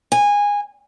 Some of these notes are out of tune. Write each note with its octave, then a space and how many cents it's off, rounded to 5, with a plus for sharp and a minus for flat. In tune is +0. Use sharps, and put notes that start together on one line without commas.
G#5 -20